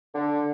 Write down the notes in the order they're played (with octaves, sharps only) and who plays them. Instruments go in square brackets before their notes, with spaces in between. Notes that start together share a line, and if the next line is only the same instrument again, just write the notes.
[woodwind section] D3